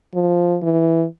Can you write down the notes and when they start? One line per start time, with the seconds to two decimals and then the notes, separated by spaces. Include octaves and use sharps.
0.15 F3
0.62 E3